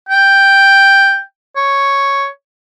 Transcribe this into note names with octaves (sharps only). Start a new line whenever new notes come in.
G5
C#5